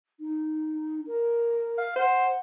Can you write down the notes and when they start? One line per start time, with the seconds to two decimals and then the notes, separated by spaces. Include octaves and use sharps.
0.20 D#4
1.07 A#4
1.78 F5
1.96 C5 F#5